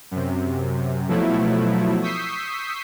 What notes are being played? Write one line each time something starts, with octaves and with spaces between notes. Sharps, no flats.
F#2 C3
B2 F3 F#3 A3 E4
C#6 D#6 E6 G6 B6 C7